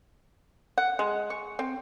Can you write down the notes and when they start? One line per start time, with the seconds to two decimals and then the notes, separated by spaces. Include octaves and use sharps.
0.78 F#5
0.99 G#3
1.30 C#6
1.59 C4